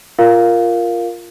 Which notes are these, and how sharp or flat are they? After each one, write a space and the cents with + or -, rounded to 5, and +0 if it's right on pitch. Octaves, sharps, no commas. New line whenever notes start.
F4 -5 A#4 +0 F5 +0